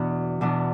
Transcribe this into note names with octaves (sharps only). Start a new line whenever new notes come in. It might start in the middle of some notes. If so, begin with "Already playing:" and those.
Already playing: E2 B2 B3 D4
E2 B2 D4